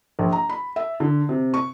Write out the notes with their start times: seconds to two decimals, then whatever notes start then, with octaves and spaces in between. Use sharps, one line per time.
0.19 A#1
0.32 A#5
0.49 B5
0.76 E5
1.00 D3
1.29 C3
1.54 C#6